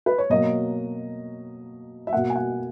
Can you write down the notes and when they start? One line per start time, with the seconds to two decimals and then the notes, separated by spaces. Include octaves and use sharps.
0.06 B4
0.18 C#5
0.30 B2 F#3 A#3 D#5
2.07 E5
2.13 B2 A#3 F#5
2.30 G#5
2.36 F#5